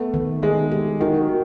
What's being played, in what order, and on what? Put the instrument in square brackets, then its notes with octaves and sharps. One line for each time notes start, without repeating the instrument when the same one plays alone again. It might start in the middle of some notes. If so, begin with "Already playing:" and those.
Already playing: [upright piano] A3 [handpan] B3
[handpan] D#3
[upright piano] G#3 [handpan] D#4
[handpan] G4
[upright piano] D#3 [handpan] F#4